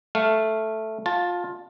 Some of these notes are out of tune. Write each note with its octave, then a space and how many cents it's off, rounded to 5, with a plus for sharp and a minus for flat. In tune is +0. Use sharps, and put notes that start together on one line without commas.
A3 +0 F5 +0
F4 +20 A5 +0